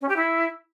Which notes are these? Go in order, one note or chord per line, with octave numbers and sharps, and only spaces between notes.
C#4
G4
E4